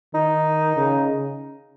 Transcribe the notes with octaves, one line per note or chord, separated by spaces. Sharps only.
D#3 D#4
C#3